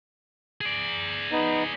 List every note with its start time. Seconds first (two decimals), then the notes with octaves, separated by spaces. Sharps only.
0.61 G#4 D5
1.32 B3 D#4